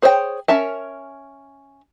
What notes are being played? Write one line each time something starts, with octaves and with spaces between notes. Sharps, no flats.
G#4 C5 C#5 E5 G5
C#4 A#4 E5 A5